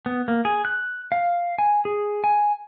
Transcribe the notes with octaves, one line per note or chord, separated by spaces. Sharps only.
B3
A#3
G#4
F#6
F5
G#5
G#4
G#5